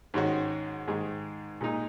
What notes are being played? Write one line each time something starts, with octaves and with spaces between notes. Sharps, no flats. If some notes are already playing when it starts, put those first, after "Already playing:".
G#2 D#3 G#3 C#4 F#4
G#2 D#3 G#3
A#2 G#3 D#4